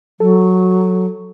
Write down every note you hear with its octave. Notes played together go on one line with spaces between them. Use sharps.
F#3 A4